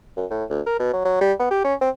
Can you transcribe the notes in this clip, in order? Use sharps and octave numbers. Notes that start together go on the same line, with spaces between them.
F#2
A2
D2
A#4
B2
F#3
F#3
G3
B3
G4
C#4
C4